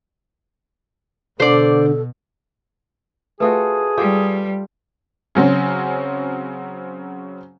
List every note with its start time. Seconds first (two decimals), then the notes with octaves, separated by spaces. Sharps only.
1.40 B2 D3 A4 C5 D5
3.40 A3 F4 F#4 G#4 B4 D#6
3.97 G3 F4 G4 A4
5.35 C#3 F#3 C4 C#4